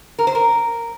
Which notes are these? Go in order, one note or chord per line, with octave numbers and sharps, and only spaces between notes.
A#4
C5
A#4